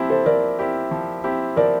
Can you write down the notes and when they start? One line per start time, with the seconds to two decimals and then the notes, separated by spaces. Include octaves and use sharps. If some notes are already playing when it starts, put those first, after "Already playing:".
Already playing: F3 C4 E4 G4
0.10 A4 C5
0.26 F3 A#4 D5
0.59 C4 E4 G4
0.91 F3
1.24 C4 E4 G4
1.56 F3 A#4 D5